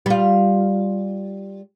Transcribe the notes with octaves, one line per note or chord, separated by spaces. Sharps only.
G3 F4